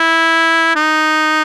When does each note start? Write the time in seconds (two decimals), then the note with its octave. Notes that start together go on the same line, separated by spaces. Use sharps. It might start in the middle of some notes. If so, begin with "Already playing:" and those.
Already playing: E4
0.76 D#4